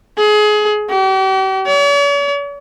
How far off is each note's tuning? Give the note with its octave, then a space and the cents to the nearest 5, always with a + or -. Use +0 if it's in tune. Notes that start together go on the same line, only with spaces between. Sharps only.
G#4 +25
G4 -40
C#5 +45